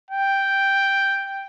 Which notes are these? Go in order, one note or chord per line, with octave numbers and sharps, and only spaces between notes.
G5